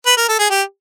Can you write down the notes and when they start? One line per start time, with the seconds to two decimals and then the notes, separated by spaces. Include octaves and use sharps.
0.06 B4
0.17 A#4
0.29 A4
0.39 G#4
0.50 G4